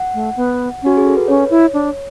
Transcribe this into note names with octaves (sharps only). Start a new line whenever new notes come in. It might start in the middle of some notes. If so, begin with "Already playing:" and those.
Already playing: F#5
A3
B3
C#4 F#4
G#4
A4
B4
C#4 C#5
E4
D4